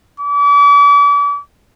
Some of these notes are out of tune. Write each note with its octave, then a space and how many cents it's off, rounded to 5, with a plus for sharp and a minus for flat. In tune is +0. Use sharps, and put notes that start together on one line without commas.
D6 -40